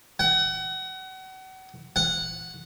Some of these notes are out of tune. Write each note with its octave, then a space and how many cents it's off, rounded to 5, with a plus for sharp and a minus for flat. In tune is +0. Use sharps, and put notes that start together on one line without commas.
F#5 +35
F#5 -10